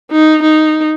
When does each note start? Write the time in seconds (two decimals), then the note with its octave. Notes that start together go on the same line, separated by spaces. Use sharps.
0.11 D#4
0.42 D#4